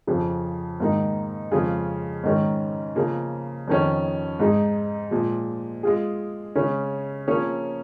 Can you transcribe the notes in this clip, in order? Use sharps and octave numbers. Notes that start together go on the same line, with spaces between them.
F2 C#3 F3
G#2 D#3 A#3 D#4
F2 C#3 G#3 F4 G#4
G#2 D#3 C#4 A#4
C#3 F3 A#3
F2 D#3 C#4
G#2 G#3 D#4 G#4
A#2 F3 G#3
G#3 F4 G#4
C#3 G#3 C#4
F3 A#3 C#4 G#4 C#5